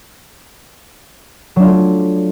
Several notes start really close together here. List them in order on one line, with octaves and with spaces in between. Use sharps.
F#3 D4 F4 A3